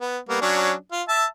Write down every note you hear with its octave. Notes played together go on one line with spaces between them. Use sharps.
B3
G3 A#3 B3
F#3 C#4 D4
F4
E5 A5